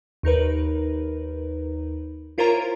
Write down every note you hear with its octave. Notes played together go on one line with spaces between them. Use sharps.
D#2 D#4 A#4 B4
E4 F4 A#4 C5 C#5 A#5